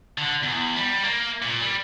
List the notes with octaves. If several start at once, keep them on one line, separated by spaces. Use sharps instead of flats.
D3
E2
G3
A#3
A#2
G3